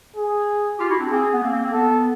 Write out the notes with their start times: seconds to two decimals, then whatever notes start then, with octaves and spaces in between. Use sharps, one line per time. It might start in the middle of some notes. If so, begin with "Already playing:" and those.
0.17 G#4
0.79 F4 G4
0.89 E4 F#4
0.99 C4 D4
1.10 A#3 C4 G#4
1.33 B3
1.41 A#3 C4
1.52 A#3 C4
1.62 A#3 C4
1.73 B3 A4